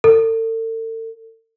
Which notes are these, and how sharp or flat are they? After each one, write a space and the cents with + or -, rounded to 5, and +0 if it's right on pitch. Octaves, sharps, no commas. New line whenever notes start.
A4 +40